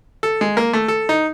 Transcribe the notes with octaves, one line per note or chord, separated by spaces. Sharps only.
A4
G#3
A#3
A3
A4
D#4